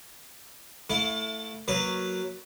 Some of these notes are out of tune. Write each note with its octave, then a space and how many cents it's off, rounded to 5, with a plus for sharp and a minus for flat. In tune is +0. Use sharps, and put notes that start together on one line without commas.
A3 +10 E4 +0 F5 +35
F#3 +0 A#3 +0 B4 +0